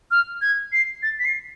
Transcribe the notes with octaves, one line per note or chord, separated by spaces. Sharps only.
F6
G#6
C7
A6
B6
C7